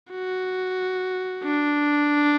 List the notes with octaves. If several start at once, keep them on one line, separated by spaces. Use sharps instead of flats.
F#4
D4